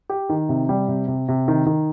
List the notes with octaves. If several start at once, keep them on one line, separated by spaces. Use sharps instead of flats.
G4
D#3
C3
G3
C3
C3
C3
D#3
D#3